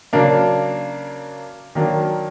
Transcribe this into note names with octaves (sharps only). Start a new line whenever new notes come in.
C#3 F#3 A#3 D4
D#3 F#3 A#3 D4